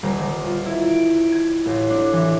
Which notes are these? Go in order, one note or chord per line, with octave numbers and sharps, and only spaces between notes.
D#1
D#1
F4
E4
D7
G#6
A1
D4
E3